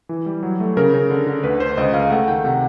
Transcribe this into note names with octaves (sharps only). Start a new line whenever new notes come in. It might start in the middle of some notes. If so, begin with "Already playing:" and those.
E3
G3
F#3
A3
C#3 A#4
C#3
D3
D3
D2 B4
D2 C5
C#2 D#5
C#2 F5
A3 F#5
D#3 G5
C3 F#5